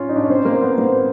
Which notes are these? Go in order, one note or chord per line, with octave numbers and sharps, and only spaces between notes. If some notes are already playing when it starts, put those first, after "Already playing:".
Already playing: C#4 F4
D#4
D4
C#4
C4 C5
A#3
B3
A#3